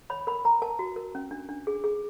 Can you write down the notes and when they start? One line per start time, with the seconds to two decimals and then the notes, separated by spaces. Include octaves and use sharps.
0.10 C#5 B5
0.27 A#4 B5
0.45 A#4 A#5
0.62 A#4 A5
0.79 F#4
0.96 A#4
1.15 C#4
1.31 D4
1.49 D4
1.67 G#4
1.84 G#4